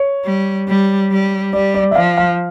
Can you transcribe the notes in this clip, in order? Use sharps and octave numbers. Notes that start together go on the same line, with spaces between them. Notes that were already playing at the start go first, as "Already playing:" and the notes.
Already playing: C#5
G3
G3
G3
G3 D5
D5
E5
F3 F5
F5